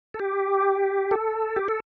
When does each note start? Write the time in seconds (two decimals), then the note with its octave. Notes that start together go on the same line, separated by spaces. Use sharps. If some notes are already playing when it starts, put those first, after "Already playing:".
0.14 A4
0.19 G4
1.11 A4
1.56 G4
1.68 A4